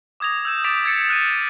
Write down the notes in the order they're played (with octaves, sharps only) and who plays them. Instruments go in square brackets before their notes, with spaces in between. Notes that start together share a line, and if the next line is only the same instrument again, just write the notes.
[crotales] D6 D#6 G#6 A#6 F7
E6 G6 E7
D6 G6 A6 B6 D7 F7
E6 G#6 A6 B6 C#7
F6 F#6 C#7 D#7
B6